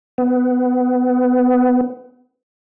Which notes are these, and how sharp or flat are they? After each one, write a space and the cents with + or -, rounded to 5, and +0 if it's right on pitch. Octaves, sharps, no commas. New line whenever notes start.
B3 +20